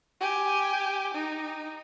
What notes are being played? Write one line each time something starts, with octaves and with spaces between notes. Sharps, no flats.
G4 G#5
D#4